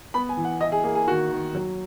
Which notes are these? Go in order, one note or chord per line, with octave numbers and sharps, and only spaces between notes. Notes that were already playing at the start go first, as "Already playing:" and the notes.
B3 B5
G#5
E3
F#5
E4 D#5
G#4
A#3 G#4
G#4
D#3 F#4
D#3
F#3